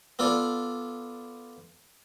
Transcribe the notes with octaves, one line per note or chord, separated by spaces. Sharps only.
B3 F4 A4 D5